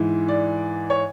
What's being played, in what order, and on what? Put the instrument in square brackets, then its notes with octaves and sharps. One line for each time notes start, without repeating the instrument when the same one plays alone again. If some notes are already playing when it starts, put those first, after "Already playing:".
Already playing: [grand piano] G#2 E3
D5
C#5